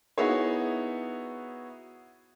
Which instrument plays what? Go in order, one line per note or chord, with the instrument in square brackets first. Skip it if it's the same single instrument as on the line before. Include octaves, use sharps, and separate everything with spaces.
[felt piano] B3 D#4 E4 F#4 G#4 C#5